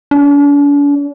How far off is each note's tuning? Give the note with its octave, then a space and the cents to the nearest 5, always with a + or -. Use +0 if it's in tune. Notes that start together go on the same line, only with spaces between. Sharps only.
D4 -45